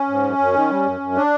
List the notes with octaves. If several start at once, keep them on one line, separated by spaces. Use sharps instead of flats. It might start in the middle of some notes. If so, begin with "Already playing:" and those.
Already playing: C#4
G#2
F#2
F#2
D#3
G3
F#2
F#2
D4